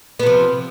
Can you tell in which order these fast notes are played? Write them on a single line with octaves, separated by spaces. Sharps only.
B3 C3 F3